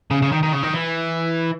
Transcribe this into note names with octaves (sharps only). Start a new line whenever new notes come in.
C#3
C#3
D#3
D#3
C#3
D#3
E3